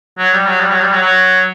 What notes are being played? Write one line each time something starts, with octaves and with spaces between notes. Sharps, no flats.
F#3
G3
F#3
G3
F#3
G3
F#3
F#3